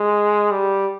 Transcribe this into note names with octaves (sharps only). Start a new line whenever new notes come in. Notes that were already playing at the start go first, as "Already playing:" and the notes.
Already playing: G#3
G3